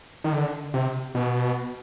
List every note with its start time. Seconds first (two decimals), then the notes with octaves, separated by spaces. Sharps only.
0.24 D#3
0.32 D3
0.74 C3
1.15 B2